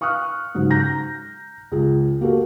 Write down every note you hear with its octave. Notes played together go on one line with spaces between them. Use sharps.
F5 C#6 D#6 F6 F#6
G#2 C#3 F#3 D#4
A#5 G6 A#6
C#2 G#4
A#3 F#4 G4 A4